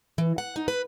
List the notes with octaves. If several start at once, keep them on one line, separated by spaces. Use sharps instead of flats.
E3
F#5
D#4
B4